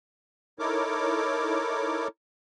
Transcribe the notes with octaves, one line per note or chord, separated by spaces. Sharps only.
D#4 E4 A4 A#4 C#5 D6